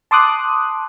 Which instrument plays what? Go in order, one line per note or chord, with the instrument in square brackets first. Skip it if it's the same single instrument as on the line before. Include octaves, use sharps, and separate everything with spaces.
[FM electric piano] A5 C6 D6 D#6 F#6